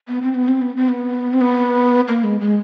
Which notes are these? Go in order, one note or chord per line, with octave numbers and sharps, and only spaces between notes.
B3
C4
B3
C4
B3
C4
B3
C4
B3
A#3
G#3
G#3